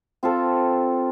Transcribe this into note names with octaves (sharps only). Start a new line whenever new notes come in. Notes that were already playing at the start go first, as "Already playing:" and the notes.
C4 F4 A4